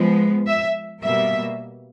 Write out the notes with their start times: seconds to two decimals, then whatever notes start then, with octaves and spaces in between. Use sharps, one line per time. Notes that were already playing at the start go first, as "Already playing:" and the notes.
Already playing: F3 G#3 B3
0.47 E5
1.02 B2 G3 A#3 E5